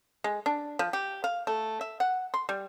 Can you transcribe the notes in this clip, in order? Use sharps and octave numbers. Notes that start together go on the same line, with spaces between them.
G#3
D4
F3
G4
F5
A3
E5
F#5
C6
G3